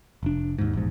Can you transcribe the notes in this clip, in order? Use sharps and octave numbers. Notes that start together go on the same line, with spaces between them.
F1 D4
D#2 G#2
A#1 E2 G#2